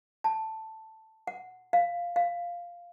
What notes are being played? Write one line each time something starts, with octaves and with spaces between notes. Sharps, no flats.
A5
F#5
F5
F5